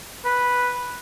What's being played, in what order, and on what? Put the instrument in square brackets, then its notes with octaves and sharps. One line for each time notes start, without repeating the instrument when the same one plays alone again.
[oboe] B4